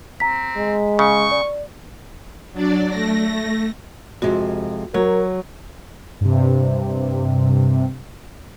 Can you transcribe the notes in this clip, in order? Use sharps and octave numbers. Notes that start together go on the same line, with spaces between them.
C4 A#5 B6
G#3
C#3 C#6
D5
F#3 D4 D5
A3 A#6
F2 C3 G#3 F#4
F#3 A#4 C#5
G2 C3